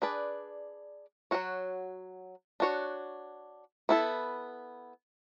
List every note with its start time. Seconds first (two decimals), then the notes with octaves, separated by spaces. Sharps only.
0.02 D4 G#4 B4 D5
1.31 F#3 C#4 F#4 C#5
2.60 D4 F#4 C#5
3.89 B3 E4 A4